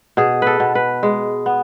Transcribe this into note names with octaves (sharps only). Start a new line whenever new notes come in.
B2 G#4
A4 B4
B2
B4
G#3
B3